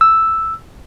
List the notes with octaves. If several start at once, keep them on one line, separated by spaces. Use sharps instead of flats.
E6